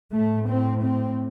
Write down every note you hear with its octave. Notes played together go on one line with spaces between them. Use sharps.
A2 A3
C4
C4